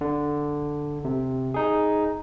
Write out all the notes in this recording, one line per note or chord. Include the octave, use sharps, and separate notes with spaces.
D3
C3
D#4 G#4